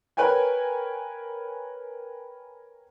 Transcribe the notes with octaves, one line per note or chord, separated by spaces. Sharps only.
A#4 B4 C#5 G5 G#5